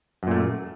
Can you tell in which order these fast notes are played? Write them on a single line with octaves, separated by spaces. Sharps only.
F#2 A#2 A3